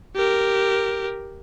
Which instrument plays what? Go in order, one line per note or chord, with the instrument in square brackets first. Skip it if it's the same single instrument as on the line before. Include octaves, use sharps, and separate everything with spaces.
[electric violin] G4 A#4